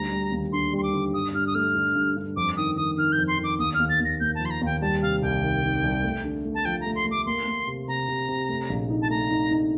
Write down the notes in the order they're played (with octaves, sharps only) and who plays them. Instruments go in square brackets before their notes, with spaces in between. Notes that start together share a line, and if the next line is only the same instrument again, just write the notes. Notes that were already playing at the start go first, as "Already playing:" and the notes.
Already playing: [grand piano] D2 G3 [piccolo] A#5
[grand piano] G3
D#2
[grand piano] D3 [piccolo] C6
[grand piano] G3 [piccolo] C6
[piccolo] D6
[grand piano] D3
[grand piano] G2 [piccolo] D#6
[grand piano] G2 [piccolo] F6
[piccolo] D#6
[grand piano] A3 [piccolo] F6
[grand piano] D3
G2
G2
[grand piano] F2 [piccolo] D6
[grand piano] D#3 [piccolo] D#6
[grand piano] D#3 [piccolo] D#6
[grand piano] D#3 [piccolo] F6
[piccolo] G6
[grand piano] F2
[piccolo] C6
[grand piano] D#3
[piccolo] D6
[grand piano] D#2 [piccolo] D#6
[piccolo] F6
[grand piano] D#2
[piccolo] A6
[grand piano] D#2
[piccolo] A#6
[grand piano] A#3 [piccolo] G6
[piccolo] A5
[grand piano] F3
[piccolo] C6
A#5
[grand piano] D#2 [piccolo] G5
[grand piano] G3 [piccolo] A5
[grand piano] C3 [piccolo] F5
[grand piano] C2 [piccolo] G5
[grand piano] D#3
D#3
C2
A3
D3
A3
[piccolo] A5
[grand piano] F3 [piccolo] G5
[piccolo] A#5
[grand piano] A3
[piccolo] C6
[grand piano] A3
[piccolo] D6
[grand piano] A#3 [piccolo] C6
[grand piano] A#3
C3
[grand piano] C3 [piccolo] A#5
[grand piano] C3
C3
A3
A#1
D#4
[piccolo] A5
[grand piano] A3 [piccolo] A#5
[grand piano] D#4
D#4